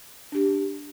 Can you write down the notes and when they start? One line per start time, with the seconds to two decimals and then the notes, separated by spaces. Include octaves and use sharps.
0.32 D4 G4